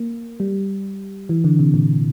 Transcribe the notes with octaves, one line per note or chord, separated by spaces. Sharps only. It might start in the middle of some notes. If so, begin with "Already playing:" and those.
Already playing: A#3
G3
E3
D3
C3
A#2